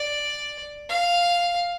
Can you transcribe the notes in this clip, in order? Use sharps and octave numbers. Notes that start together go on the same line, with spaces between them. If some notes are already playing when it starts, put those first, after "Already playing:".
Already playing: D5
F5